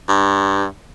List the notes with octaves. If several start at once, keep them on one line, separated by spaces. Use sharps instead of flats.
G2